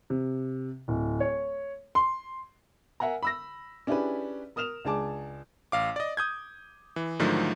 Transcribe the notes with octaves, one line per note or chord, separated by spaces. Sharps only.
C3
D1
C#5
C6
A#4 E5 F#5 G#5 A#5
B5 E6 A#6
C#4 D4 E4 G4 G#4 B4
A#4 D#6 F6 E7 F7
C#2 D4 G#4 A5 D6
A1 F5 D6
D5 D#5
D#6 G6 G#6
E3
G#2 D3 D#3 F3 F#3 A3